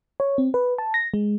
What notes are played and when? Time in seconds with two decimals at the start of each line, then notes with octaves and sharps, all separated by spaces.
0.20 C#5
0.38 C4
0.54 B4
0.78 A5
0.94 A#6
1.14 G#3